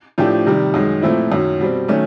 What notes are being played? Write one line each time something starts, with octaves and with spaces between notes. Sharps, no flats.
A2 F3 A3 D4 G4
C3 D#3 G3
F#2 D#3 G#3
A#2 F3 A3 C4 E4
F#2 D#3 F#3
B2 G3 C4
D#3 F#3 A3 C#4